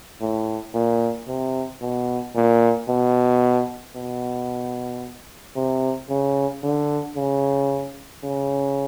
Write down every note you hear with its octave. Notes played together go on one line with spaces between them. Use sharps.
A2
A#2
C3
B2
A#2
B2
B2
C3
C#3
D3
C#3
C#3